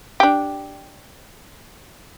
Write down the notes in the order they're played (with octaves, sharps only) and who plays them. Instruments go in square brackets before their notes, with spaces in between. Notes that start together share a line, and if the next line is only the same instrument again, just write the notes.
[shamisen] D4 G4